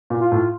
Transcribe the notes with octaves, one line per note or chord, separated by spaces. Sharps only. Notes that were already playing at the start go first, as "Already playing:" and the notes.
A#2
F4
A2